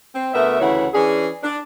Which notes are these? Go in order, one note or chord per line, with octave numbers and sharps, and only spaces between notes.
C4
D2 A3 B3 A#4 E5
D2 C#3 E3 E4 C#5 F#5
E3 C#4 D4 G#4
D4